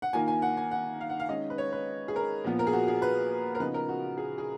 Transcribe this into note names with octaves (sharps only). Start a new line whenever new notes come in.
F#5
D#3 A#3 F4 G#5
G#5
F#5
G#5
F#5
F5
F#5
F5
D#3 G#3 C#4 D#5
B4
C#5
B4
G#4
A#4
A#2 F3 B3
A#4
G#4
F#4
G#4
B4
A#4
C#3 F3 B3 D#4 B4
A#4
F#4
G#4
G#4